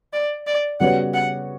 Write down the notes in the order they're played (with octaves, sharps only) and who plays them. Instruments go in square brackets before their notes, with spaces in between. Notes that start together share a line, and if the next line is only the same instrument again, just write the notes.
[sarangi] D5
D5
[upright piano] C#3 G3 B3 F#4 C#5 [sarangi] F#5
[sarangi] F#5